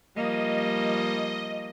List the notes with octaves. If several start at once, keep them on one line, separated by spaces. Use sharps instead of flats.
F3 G3 A#3 D#5